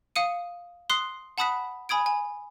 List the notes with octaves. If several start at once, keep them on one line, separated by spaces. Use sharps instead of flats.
F5 D#6 C#7 D#7
C6 D#6 F#6 C7
F#5 A5 B5 D#6 F#6 B6
G#5 B5 D#6 G#6 D7
G#5